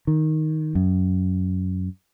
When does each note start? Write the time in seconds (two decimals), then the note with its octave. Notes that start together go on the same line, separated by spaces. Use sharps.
0.07 D#3
0.75 F#2